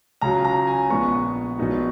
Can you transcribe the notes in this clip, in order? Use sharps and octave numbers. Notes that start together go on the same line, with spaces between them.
C#2 C#3 F#3 A#5
A#5
G#5
A#1 A#2 G#3 B3 C#6
A#1 A#2 F#3 B3 D#4